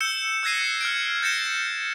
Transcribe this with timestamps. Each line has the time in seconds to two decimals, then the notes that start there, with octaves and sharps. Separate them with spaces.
0.01 E6 G6 C#7 E7 G7
0.43 E6 F#6 G#6 A#6 C7 D#7
0.81 F6 G#6 D7
1.22 G6 A6 A#6 C#7 E7